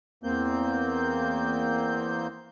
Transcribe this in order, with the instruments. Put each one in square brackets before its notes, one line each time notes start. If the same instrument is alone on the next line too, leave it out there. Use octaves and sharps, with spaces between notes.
[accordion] E2 A#3 C4 G6